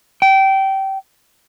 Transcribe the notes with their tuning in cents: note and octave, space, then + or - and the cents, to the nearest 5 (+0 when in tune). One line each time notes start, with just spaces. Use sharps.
G5 -20